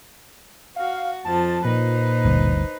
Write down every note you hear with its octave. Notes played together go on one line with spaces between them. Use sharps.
F#4 F5
F2 F3 A5 A6
A#2 D#4 B4 C5
G1 D2 G2